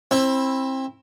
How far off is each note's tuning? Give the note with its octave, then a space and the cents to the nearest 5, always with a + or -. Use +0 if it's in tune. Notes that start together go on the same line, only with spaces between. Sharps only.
C4 +25 E4 +0